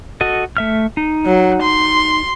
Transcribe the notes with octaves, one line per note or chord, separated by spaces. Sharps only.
F#4 A4 D#5
A3 E5 F6
D#4
F#3
C6